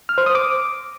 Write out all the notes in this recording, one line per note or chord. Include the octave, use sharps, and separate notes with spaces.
F6
C5
D#6
D6